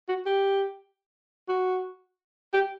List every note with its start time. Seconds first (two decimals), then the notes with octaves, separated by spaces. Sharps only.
0.09 F#4
0.26 G4
1.49 F#4
2.54 G4